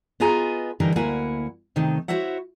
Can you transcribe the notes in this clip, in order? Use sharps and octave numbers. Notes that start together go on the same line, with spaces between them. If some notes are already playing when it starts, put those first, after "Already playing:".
B3 F4 G#4 D#5 G#5 A#5
D3 E3 G3 D#4 A#4
D2 A#3 E4 F#5 G#5
C3 D#3 A3 D#4
E4 F#4 C5 C#5 E5 F#5